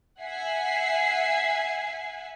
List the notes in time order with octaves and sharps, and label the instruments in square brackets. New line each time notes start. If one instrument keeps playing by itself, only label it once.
[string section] E5 F#5 G#5 C7